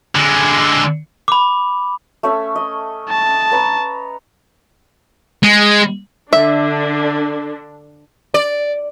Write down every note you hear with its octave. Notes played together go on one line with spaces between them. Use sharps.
D3 G#3
B5 D6
A3 C#4 E5
D#5
A5
B4 C#5 A#5
G#3
D3 D4 E5
D5